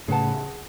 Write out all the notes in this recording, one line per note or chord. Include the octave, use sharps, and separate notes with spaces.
A2 C#3 G#4 B4 F#5 A5